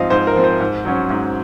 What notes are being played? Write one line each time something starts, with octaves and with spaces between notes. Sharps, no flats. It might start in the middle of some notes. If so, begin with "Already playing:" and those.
Already playing: G#2 F3 C4 D#5 F5
G#2 C5
A#4
F3 C4
C5
G#2
F#3 C#4
G#2